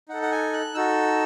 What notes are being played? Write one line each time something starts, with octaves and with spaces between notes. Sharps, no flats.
D#4 A4 F#5
F#5
G#5
F#6
D#4 F#4 A4 E6